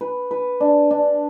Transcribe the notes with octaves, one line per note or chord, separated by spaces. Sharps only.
B4
B4
D4
D4